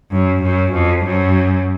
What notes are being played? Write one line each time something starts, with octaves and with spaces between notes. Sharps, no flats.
F#2
F#2
F2
F#2